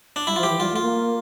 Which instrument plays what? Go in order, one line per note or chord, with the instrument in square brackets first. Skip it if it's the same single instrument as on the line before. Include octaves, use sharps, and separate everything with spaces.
[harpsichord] D4
[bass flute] G3 [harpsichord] E4
[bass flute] F3 [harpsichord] F4
[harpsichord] G4
[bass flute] E3
[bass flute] G3 [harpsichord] F4
[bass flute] A3
[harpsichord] F4
[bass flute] A#3